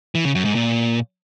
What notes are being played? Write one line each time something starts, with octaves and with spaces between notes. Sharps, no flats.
E3
C#3
F#2
G#2
A#2